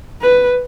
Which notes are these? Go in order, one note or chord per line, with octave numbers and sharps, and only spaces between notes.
B4